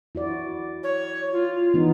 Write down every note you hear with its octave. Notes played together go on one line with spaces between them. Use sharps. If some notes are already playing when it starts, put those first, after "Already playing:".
E4 F#4 D5
C#5
F4
E3 B3 D#4